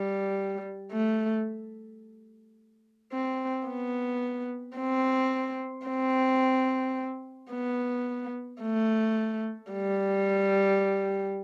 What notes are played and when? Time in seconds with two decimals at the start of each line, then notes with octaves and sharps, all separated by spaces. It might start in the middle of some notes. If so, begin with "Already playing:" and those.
Already playing: G3
0.93 A3
3.13 C4
3.67 B3
4.77 C4
5.87 C4
7.52 B3
8.62 A3
9.72 G3